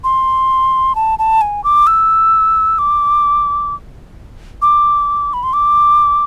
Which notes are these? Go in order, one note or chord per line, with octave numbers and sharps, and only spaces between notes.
C6
A5
A5
G#5
D6
E6
D6
D6
B5
C6
D6